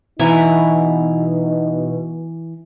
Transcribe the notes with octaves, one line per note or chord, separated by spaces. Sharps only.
B2 E3 D#4 E4 G#5 A#5